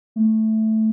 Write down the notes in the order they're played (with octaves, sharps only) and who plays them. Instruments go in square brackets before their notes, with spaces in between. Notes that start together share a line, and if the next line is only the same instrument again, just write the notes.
[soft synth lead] A3